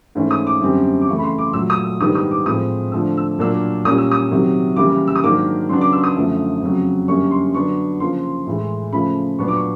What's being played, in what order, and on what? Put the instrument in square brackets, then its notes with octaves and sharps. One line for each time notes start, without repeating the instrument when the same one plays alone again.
[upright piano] G#2 E3 A3 C#4
D#6
D6
F#2 D3 G3 C4
D6
C#3 E3 A3 C#6
B5
C6
D6
A#2 F#3 A3 E6
D#6
E6
G#2 D#3 G3 B3 D4 D#6
D#6
D6
A2 F3 G#3 C4 D#6
D3 F3 A3 D4 E6
E6
A#2 F#3 A#3 D4 E6
A#2 G3 A#3 C#4 D#6
E6
D#6
C3 D#3 F#3
C#3 E3 G3 A#3 D6
E6
D#6
G#2 D#3 F#3 A#3 D4 D6
C#3 F#3 B3 D4 C6
D6
E6
D#6
F#2 D3 F3 A3
F2 C#3 F#3
F#2 D3 G3 A#3 C#4 C#6
C6
D3 F#3 B3 D4 C#6
C#3 F3 A#3 C6
A2 E3 G#3
C#3 F3 A3 B5
A#2 F#3 B3 D4 C#6
D6
C#6